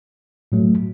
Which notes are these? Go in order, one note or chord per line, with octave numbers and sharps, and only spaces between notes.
A2 F#3 A3